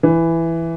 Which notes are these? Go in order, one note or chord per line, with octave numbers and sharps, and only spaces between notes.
E3